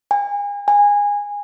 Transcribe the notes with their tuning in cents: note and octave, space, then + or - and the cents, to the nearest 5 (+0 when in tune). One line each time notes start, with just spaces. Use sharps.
G#5 -35
G#5 -20